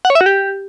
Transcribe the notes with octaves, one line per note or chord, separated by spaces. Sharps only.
F#5
C#5
E5
F#4
G4